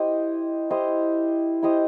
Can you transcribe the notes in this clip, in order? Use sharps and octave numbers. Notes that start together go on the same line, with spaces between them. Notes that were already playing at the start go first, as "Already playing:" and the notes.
Already playing: E4 G4 C5 D#5
E4 G4 C5 D#5
E4 G4 C5 D#5